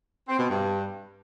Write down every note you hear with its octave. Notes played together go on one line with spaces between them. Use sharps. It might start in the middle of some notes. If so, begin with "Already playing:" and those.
C4
B2
G2